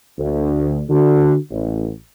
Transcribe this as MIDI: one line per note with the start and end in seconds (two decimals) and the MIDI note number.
0.19 0.83 38
0.90 1.35 50
0.90 1.35 66
1.51 1.91 33